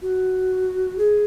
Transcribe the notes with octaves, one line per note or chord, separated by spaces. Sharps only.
F#4
G#4